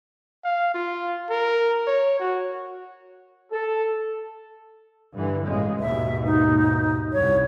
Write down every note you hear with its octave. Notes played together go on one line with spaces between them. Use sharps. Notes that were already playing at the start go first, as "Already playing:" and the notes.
F5
F4
A#4
C#5
F#4
A4
G2 D3 E3
A1 C#3 G#3
D#2 G#2 B2 E5
D#4
C2 F#2 C#5